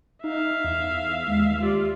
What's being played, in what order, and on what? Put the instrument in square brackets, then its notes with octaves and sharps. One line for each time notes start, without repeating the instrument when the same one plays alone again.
[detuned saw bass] D#4 [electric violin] E5 F5
[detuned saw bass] E2
[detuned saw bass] D#2 [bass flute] G#3
[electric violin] F4 D5 [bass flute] G4